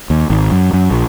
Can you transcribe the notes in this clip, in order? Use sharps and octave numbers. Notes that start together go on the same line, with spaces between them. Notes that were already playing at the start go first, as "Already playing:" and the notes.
D#2
G#1
F#2
F#2
A#1